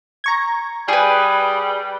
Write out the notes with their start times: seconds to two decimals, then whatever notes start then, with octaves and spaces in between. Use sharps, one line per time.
0.24 A#5 C#6 G#6
0.88 G3 G#4 B4